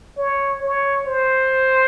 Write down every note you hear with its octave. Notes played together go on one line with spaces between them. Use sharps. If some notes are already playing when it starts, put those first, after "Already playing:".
C#5
C#5
C5